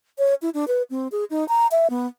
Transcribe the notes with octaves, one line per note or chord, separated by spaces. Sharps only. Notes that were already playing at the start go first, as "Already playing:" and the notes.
C#5
E4
D4
B4
C4
G#4
D#4
A#5
E5
B3